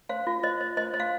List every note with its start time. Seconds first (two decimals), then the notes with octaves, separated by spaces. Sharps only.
0.09 C5 F5
0.27 F4
0.43 C5 D#5
0.61 C5
0.77 C5 D#5
0.94 C5
1.00 F5